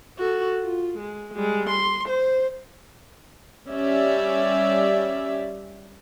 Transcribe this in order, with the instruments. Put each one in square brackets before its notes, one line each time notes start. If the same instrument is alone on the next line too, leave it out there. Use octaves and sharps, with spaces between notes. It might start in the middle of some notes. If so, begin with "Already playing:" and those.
[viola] F#4 A4
F4
G#3
G3 G#3
C6
C5
[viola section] G3 C#4 D5 E5